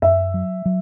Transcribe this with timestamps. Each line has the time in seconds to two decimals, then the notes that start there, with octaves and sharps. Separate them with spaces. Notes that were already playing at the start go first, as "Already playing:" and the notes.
0.02 F#2 E5
0.34 F#3
0.66 F#3